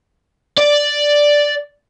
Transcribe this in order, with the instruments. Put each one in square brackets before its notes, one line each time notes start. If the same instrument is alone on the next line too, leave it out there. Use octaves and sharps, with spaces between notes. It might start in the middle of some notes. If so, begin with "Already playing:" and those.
[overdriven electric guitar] D5